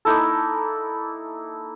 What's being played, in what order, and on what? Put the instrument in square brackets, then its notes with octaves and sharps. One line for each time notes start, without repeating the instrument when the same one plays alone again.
[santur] A#3 D#4 E4 A4